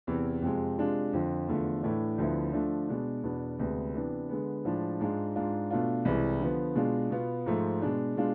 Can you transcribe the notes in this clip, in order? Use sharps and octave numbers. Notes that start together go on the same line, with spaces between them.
E2 C3 E3
F2 C3 F3 G#3
C3 G#3 D4 F4
F2 D3 F3
E2 D3 F3 A3
A2 E3 A3 D4
D2 D3 F3 B3 E4
D3 F3 A3 D4
B2 G#3 D4
E2 B2 B3 D4
D2 C3 G#3 B3
C3 E3 B3 D4
D3 G#3 B3
A2 F3 G#3 D4
G#2 G#3 D4 F4
G#2 G#3 D4 F4
B2 A3 D4 F4
C2 C3 E3 G#3
D3 F3 B3
B2 G#3 D4 F4
B2 B3 F4
G#2 F3 A3
B2 G#3 D4
B2 G#3 D4 F4